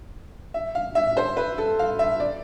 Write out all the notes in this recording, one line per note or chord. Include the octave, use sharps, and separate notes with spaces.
E5
F5
E5
C5
B4
A4
F5
E5
D5